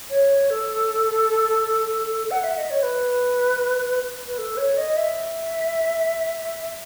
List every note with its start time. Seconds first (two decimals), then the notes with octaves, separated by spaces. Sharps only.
0.10 C#5
0.50 A4
2.31 F#5
2.44 E5
2.57 D#5
2.70 C#5
2.83 B4
4.27 B4
4.38 A4
4.57 C#5
4.77 D#5
4.97 E5